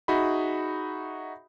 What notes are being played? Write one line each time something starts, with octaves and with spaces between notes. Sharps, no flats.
D#4 F#4 G#4 E5 B5